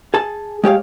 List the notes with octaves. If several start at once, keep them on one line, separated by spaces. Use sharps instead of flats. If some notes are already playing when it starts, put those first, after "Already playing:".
G#4 A5
G#3 G4 C#5 F5